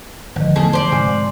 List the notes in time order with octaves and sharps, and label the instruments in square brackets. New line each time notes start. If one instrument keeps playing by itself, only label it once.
[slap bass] G#1 [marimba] D3 F3
[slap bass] E2 G#2 A3 [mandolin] G#4 A4
[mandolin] C5 D5
[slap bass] G#2 C3 [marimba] G#5